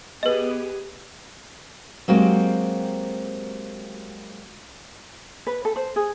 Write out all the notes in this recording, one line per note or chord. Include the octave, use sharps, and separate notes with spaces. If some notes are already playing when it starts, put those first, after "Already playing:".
B3 G4 G#4 B4 D#5
F#3 G#3 A#3 C4 F#4 G4
B4
A4
C5
G#4